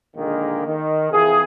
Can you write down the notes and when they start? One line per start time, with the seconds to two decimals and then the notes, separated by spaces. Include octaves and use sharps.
0.16 A#1 D3 D#3 G#3 A#3
0.66 D#3
1.11 C3 E3 F3 G#4